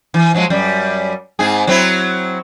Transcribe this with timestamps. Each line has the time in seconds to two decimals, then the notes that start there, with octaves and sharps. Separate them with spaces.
0.14 E3
0.35 F3 F#3 G#3
0.50 F#2 G3
1.39 G#2 C4 G#4
1.67 F#3 C4 E4